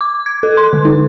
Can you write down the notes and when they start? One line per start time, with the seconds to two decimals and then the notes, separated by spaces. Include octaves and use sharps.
0.01 D6
0.26 G#6
0.43 A4
0.57 C6
0.73 D3
0.85 D#4